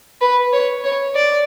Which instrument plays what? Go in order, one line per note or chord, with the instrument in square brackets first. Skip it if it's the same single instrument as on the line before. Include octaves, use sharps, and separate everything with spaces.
[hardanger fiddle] B4
C#5
C#5
D5